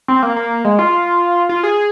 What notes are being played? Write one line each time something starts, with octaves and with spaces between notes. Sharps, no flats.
C4
A#3
A#3
G#3
F4
F4
G#4